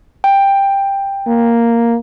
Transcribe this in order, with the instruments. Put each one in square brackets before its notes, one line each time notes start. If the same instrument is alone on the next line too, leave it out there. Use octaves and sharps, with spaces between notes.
[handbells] G5
[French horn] A#3